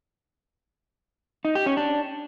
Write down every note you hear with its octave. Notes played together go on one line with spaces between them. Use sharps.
D#4
G4
C#4
D4